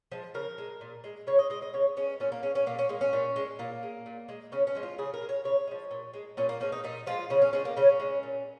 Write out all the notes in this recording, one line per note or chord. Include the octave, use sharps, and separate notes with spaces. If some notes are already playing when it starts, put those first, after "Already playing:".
F3 G#3
C#3 A#4
G#3
A#2
G#3
C#3 C#5
D#5
G#3 D#5
D#5
C#3 C#5
G#3 C#4
A#2 C#4
A#3
G#3 C#4
C#4
A#2 A#3
C#4
G#3 A#3
C#4
A#2
G#3
A#2 A#3
G#3
A#2
G#3
C#3 C#4
C#4
F3 G#3
F4
C#3 G#4
A#4
G#3
C#5
C#3 C#5
F3 G#3
A#2
G#3
A#2 C#4
A#3
F3 G#3 C#4
D#4
A#2 D#4
F3 G#3 F4
C#3 C#4
C#4
F3 G#3 C#4
A#3
C#3 C#4
G#3
A#2